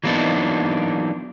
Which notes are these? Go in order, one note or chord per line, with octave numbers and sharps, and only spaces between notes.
E3 F#3 A#3 B3 D4 D#4